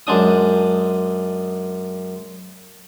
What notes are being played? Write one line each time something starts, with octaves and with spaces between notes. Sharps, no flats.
F#2 G#3 D4 D#6